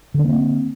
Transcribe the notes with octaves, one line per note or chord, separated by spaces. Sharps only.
D3 A#3 C4 D4